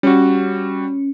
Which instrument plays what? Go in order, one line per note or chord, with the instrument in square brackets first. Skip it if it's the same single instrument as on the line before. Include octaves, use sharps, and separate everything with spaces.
[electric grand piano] G3 F#4 [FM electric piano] C#4